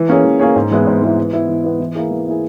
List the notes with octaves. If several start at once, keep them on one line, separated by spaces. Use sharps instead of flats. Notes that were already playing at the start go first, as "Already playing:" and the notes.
Already playing: E3
A#3 C#4 G#4 C#5
E3
A#3 C#4 G#4 C#5
G#2
E3 G#3 B3 E4
G#2
E3 G#3 B3 E4
E3
B3 E4
E3
B3 E4
E3
A#3 E4 G#4
E3
A#3 E4 G#4